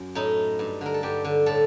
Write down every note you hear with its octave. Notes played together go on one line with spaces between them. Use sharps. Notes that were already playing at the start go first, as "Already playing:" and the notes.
Already playing: F#2
A2 D#4
G2
D3 A#4
A4
G2 G4
D3
A2 A4